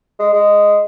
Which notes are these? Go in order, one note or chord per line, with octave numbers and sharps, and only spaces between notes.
G#3
G#3